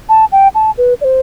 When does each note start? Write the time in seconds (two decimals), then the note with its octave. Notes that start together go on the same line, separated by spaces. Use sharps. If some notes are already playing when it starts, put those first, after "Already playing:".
0.09 A5
0.32 G5
0.55 A5
0.78 B4
1.01 D5
1.04 C5